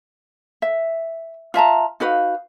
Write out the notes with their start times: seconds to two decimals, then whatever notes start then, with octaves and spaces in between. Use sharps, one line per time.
0.62 E5
1.54 F4 E5 A5 A#5
2.00 D#4 F#4 B4 F5